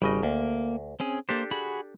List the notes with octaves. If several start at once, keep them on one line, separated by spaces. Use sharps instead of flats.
G#1 C#3 G3 D#5
D2 A#3
C4 C#4 G#4
A#3 D4 G4 A4 C5
F#4 G#4 B5